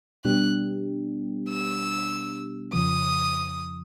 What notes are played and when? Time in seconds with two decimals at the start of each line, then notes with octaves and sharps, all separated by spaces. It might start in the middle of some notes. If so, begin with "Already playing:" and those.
0.25 B2 G3 B3 D4 G4 F#6
1.50 E6
2.73 F2 C#3 F3 D#6